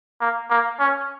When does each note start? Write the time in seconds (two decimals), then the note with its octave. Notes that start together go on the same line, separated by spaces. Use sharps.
0.21 A#3
0.50 A#3
0.79 C#4